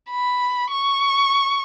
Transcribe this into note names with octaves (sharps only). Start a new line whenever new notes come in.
B5
C#6